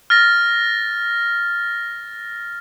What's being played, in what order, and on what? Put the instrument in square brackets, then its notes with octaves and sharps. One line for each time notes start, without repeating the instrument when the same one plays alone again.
[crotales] F6 A6 A#6